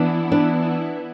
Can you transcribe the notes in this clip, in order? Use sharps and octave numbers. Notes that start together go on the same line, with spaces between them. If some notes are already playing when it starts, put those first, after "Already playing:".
Already playing: E3 B3 D4 E4
D4